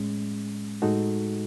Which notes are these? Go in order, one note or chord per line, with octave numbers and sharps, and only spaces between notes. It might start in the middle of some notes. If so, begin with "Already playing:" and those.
Already playing: A2 G#3 C#4
A2 G#3 D#4 F#4 A4